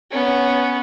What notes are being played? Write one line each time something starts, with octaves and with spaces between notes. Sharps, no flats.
B3 C#4